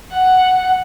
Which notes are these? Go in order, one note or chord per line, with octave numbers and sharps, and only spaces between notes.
F#5